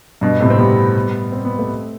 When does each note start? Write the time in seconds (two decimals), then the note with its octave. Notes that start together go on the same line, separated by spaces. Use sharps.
0.21 G2 B2
0.40 A2 C3
0.50 C4
0.58 G3 B3
1.32 C4
1.45 B3
1.59 A3 C4